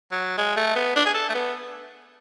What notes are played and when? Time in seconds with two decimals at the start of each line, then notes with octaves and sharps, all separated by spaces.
0.12 F#3
0.38 G#3
0.56 A3
0.75 B3
0.96 D4
1.06 G#4
1.14 A4
1.29 A3
1.35 B3